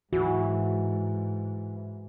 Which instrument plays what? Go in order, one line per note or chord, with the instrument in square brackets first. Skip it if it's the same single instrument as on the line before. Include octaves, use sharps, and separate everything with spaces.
[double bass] G#2 [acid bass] E3 [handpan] F#4